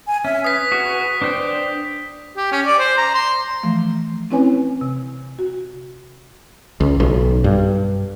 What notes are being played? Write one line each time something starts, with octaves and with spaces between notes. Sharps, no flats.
G#5
C#4 E5
B4 D#6 B6
F#4 G#4
D4 C5 G5
G4
C#4
D5
C5
A#5
C6
E3 F3 A3
C4 C#4 E4 B4 C#5 G#5
C3
F#4
C#2
B1
G2